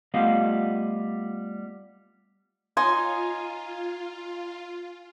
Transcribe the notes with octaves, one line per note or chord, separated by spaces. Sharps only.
G3 A3 B3 F4 D#5 F5
D#4 F4 G#5 C6 D#6